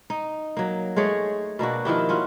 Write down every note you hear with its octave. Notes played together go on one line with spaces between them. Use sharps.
D#4
F#3 A#3
G#3 A3 G#4 C#5
B2 A#3 D4 F#4
D#3 F3 E4 G4
C#4 F4 F#4